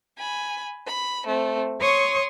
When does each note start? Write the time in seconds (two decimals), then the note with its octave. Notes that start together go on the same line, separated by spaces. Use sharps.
0.17 G#5 B5
0.86 B5
1.25 A3 C4
1.78 C#5 C6 C#6 D#6